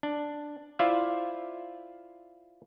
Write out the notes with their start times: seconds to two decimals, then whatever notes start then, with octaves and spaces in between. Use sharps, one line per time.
0.03 D4
0.79 E4 F4 C5 D5 E5 F5